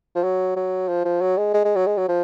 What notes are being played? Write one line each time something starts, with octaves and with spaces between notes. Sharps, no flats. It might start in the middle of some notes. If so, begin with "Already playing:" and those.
F3
F#3
F#3
F3
F3
F#3
G#3
G#3
G#3
F#3
G#3
F#3
F3